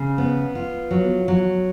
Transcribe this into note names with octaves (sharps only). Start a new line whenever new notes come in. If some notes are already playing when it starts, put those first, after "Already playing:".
Already playing: C#3
B3
F4
F#3
F#3